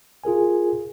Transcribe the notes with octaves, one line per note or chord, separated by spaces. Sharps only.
F4 G#4 A#4 G#5